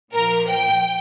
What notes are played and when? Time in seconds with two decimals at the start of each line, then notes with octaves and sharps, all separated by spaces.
0.13 A#2 F3 A#4
0.48 G5